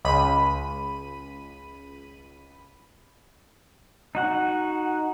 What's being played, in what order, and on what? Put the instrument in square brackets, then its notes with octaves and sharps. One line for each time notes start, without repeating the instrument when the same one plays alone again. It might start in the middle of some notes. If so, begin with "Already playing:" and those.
[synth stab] C#2 B5 D#7
[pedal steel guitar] D#4 F#4 F#5